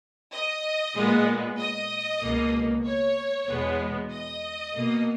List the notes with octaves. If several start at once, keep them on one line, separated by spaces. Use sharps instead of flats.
D#5
A#2 G#3 B3
D#5
C#2 B2 A#3
C#5
E2 B2 G#3 B3
D#5
B2 A#3